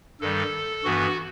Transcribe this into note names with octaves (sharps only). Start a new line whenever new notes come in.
G2 D#3 G3 A4
G2 E3 B3 F#4